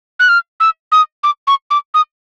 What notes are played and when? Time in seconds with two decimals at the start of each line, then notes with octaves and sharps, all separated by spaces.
0.19 F#6
0.29 F6
0.60 E6
0.92 D#6
1.23 D6
1.47 C#6
1.70 D6
1.94 D#6